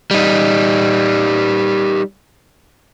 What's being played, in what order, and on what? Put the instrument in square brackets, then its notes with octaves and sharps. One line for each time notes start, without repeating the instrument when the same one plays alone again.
[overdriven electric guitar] G3 D#4